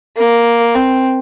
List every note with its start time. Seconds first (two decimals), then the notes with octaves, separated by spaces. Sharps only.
0.18 A#3
0.75 C4